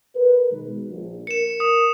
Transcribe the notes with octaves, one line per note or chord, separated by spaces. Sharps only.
A#4 B4
B2 D#3 G#3
A#1
A#4 C#7 E7
D#6